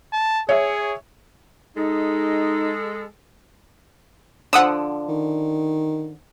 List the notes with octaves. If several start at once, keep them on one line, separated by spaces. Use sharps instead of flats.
A5
G#4 C#5 E5
G#3 D#4 A4
D3 F3 F#5 D#6 E6
D#3